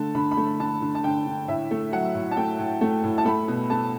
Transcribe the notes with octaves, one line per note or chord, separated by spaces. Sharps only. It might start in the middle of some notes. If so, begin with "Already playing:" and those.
Already playing: D3 A3 A5
D3 B5
B5
A3
D3 A5
D3
A5
D3 G5
D3
A2 E5
A3
F#3 F#5
A2
A5
A3 G5
A2
A3
A2
A5
A3 B5
B2
A3 A5